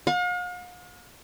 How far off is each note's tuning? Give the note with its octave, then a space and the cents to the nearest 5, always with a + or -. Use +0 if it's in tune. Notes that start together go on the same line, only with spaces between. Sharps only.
F5 +45